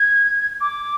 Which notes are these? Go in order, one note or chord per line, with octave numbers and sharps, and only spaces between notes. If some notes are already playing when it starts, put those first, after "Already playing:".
Already playing: G#6
D6